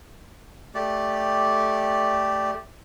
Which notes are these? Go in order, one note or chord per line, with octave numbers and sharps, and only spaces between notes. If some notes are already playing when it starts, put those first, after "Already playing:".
A3 G4 D5